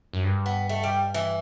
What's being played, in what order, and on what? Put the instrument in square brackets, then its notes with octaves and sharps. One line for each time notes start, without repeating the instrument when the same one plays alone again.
[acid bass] F#2
G2
[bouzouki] B3
A3
G3
E3